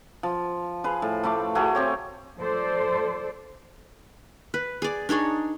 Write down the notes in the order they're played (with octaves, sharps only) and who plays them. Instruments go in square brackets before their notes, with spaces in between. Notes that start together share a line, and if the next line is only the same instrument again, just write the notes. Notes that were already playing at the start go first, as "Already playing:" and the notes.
[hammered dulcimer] F3
G#4 B4 F5
A2
A3 F5 B5 D6
A3 F#4 G#4 A#4
C4 G4 C#5
[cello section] F3 A4 C5 D5
[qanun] B4
G#4 D5
D4 D#4 G#4 C#5